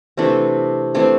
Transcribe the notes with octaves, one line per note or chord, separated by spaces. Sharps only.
C3 E3 A3 C4 D4
C3 E3 A3 C4 D4